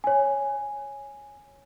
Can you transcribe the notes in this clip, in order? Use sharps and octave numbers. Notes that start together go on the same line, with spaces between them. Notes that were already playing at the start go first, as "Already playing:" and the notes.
C#5 G#5